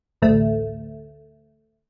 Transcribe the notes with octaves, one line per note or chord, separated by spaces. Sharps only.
A1 D2 A3